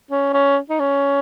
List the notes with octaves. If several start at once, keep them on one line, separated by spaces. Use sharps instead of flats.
C#4
C#4
D#4
C#4